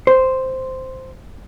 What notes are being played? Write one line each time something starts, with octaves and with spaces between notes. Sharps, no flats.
C5